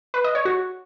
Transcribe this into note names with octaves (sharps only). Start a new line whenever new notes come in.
B4
D#5
C#5
F#4